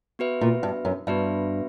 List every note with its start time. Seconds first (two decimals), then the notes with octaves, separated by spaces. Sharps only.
0.19 B3 F#4 B4 E5
0.41 A#2
0.63 G2
0.85 F#2
1.07 G2 B3 F#4 B4 E5